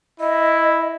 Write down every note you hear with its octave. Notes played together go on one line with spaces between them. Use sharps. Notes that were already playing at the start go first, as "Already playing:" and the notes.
E4 D#5